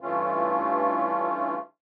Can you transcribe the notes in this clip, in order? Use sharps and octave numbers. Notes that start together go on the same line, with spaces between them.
G2 E3 A3 C#4 F4